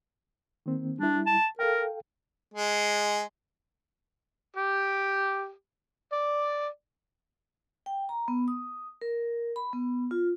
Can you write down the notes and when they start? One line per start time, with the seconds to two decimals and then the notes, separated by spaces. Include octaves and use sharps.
0.66 D#3 A#3 C4
0.99 G3 D4 E4
1.26 A5
1.59 A4 A#4 F5 G5
2.54 G#3
4.57 G4
6.13 D5
7.86 G5
8.09 A#5
8.28 B3
8.48 D#6
9.01 A#4
9.56 B5
9.73 B3
10.11 F4